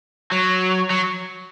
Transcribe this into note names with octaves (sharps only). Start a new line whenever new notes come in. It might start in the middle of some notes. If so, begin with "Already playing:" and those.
F#3
F#3